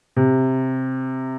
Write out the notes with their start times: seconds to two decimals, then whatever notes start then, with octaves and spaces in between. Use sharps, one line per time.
0.16 C3